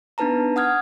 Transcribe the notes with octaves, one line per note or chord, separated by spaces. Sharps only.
B3 D4 D#4 B4 A5 A#5
F#5 D#6 F6 G#6